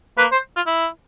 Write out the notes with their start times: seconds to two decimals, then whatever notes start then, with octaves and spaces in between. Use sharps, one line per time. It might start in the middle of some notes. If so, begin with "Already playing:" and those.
0.18 A#3 B4
0.32 C5
0.56 F4
0.67 E4